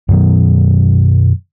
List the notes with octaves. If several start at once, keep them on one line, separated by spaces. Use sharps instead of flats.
F#2 B2 D#3 F#3